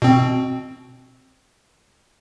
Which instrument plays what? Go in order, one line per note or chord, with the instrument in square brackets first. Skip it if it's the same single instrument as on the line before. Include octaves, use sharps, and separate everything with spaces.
[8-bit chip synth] B2 C4